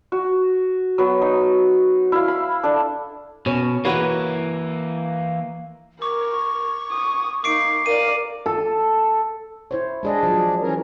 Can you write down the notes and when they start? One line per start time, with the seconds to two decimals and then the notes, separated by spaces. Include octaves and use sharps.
0.12 F#4
0.98 F#3 B3
1.22 D#4
2.12 E4 F5
2.28 B5
2.63 D4 A4
3.46 B2 C#4
3.85 E3 A#3 F#4 B4 C#5
6.02 A#4 C#6 D6
6.91 D#6
7.44 A#3 D#4 D6 C7 D7
7.86 A#4 D5 F5 D#7
8.46 A4
9.71 E4 C5 C#5
10.03 G#3 D4 G#4 D#5
10.23 F3 F#3
10.61 E3 C#4 A#4